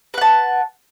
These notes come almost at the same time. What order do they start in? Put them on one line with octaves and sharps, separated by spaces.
B4 F#5 A5